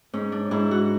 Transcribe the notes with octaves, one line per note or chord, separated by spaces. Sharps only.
G#2 C#4
D4
G#2 E4
F#4